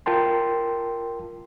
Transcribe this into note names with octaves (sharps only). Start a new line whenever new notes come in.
F4 A#4 G5 A5 C6